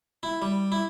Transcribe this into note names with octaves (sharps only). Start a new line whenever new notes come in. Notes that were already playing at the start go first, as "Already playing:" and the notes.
E4
G3
E4